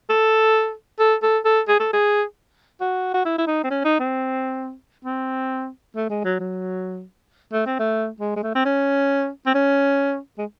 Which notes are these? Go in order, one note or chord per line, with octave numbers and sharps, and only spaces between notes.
A4
A4
A4
A4
G#4
A4
G#4
F#4
F#4
E4
E4
D#4
C4
C#4
D#4
C4
C4
A3
G#3
F#3
F#3
A3
C4
A3
G#3
G#3
A3
C4
C#4
C4
C#4
G#3